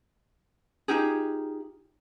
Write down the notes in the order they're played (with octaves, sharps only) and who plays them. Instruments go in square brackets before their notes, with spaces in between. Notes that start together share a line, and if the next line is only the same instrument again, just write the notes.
[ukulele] D#4 F4 G4 G#4